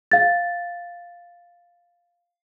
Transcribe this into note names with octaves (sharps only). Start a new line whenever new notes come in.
F5 A6